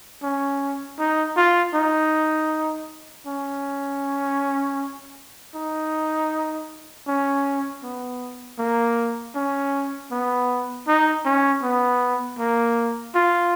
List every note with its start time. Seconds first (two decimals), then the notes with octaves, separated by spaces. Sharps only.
0.22 C#4
0.99 D#4
1.36 F4
1.75 D#4
3.27 C#4
5.55 D#4
7.07 C#4
7.83 B3
8.59 A#3
9.35 C#4
10.11 B3
10.87 D#4
11.25 C#4
11.63 B3
12.39 A#3
13.15 F4